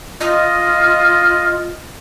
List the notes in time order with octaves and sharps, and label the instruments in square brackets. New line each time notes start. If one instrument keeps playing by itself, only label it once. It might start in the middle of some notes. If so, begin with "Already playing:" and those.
[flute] F4 [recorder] D#5